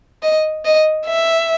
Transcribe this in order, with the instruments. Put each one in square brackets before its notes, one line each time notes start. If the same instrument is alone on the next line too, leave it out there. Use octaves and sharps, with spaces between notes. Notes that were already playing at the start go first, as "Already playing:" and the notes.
[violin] D#5
D#5
E5